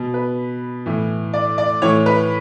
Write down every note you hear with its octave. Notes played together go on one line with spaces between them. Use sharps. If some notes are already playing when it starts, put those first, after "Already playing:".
Already playing: B2
B4
A2 E3
D5
D5
A2 E3 C#5
B4